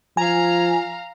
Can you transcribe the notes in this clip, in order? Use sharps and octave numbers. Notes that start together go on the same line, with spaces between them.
F3 F5 G#5 A#5